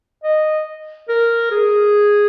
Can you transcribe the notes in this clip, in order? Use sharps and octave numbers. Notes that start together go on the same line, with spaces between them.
D#5
A#4
G#4